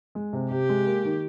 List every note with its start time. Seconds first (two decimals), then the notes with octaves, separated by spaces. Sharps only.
0.15 G#3
0.33 C3
0.50 C3 G4
0.69 G#3
0.87 A#3
1.05 D#3